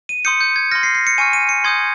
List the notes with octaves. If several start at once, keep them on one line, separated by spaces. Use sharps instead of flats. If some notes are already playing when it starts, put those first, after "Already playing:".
D#7
C6 D#6 G6 C#7
G6
G#6
C6 F6 A#6
C7
C7
C#7
G#5 C#6 F6 D#7
D#7
C#7
C6 D#6 G6 G#6